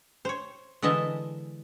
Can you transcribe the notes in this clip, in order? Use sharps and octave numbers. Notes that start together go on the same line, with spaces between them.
C5 C#5
D3 E3 G#3 D#5 E5 A5